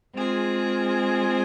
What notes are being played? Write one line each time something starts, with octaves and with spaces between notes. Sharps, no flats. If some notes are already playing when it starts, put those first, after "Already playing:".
G#3 C4 F4 G#4